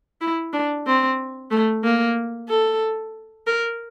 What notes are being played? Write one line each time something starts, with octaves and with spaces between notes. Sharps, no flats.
E4
D4
C4
A3
A#3
A4
A#4